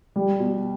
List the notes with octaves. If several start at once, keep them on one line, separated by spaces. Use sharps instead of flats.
G3
B2